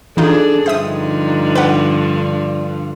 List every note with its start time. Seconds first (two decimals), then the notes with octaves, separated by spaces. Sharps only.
0.17 E3 D4 D#4 F4 G#4 A4
0.66 G2 D3 F3 D#4 C5 E5 D#6
1.55 B4 F#5
2.15 D4